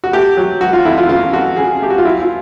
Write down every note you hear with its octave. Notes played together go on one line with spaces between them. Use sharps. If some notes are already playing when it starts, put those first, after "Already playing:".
F#4
A3 G4
F#3
F#3 F#4
F4
F2 E4
F4
C#3 F4
F2 F#4
C#3 G#4
A3 G4
F#4
F4
F#3 E4
F4